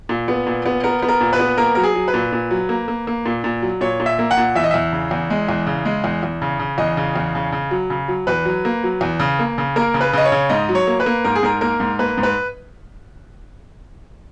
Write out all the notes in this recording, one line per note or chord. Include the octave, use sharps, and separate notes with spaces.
A#2
B3
A#2
B3
B3 A#4
B3
A#4
A#2
B4
B3
A#3 A#4
F#3 A#4
G#4
F#3
B4
A#2
A#2
F#3
A#3
A#3
A#3
A#2
A#2
F#3
A#2 C#5
A#2
E5
A#3
F#5
A#2
E2 E5
D#5
E2 E5
C#3
E2
G#3
E2
C#3
G#3
E2
E2
C#3
C#3
E2 D#5
C#3
E2
C#3
C#3
F#3
C#3
F#3
E2 B4
F#3
A#3
F#3
E2
C#3
A#3
C#3
A#3 A#4
C#3
B4
C#3 D#5
C#5
C#3
G#2 D#5
F#3
C#5
A#3
B4
A#3
G#2 A#4
G#4
G#2 A#4
A#3 A#4
G#2
A#3 B4
G#2
B4